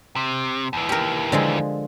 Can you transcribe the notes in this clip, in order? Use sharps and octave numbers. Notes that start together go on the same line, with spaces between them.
C3
D#2 E3
G4 A#4
D3 F3 G#3